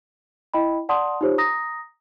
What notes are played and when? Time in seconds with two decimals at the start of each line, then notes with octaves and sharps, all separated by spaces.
0.54 E4 D#5 G5 B5
0.89 D5 F#5 A5 C6 D#6
1.21 D#4 F4 G4 C5 C#5
1.38 A#5 D#6 A#6